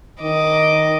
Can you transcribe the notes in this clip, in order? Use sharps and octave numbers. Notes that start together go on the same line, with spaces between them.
D#3 D#5 D6